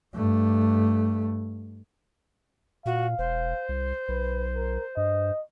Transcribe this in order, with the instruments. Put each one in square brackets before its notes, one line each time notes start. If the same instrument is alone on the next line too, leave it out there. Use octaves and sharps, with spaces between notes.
[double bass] G2 A3
[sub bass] A#2 [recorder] F#4 [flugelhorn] F5
[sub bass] E1 [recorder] C5
[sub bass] C2
[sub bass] B1 [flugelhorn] B4
[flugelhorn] A#4
[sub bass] G2 [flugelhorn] D#5